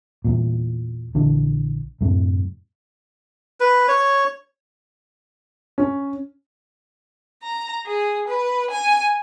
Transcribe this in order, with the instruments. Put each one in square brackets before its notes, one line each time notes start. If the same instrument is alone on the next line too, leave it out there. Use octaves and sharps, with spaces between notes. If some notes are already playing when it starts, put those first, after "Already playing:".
[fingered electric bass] E2 A#2
A#1 D3 E3
F#2 A2 C3
[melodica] B4
C#5
[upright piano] C#4
[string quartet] A#5
G#4
B4
G#5